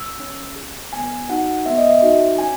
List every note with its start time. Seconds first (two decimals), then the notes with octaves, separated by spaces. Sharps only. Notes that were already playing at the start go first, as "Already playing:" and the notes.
Already playing: E6
0.20 C#4
0.56 G#4
0.93 B3 G#5
1.29 D#4 F#4 F#5
1.66 B3 E5
1.78 D#5
1.90 E5
2.02 D#4 F#4
2.38 C#4 G#5